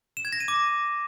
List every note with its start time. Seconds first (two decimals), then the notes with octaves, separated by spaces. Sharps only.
0.17 E7
0.25 G#6
0.33 A#6
0.40 D#7
0.48 D6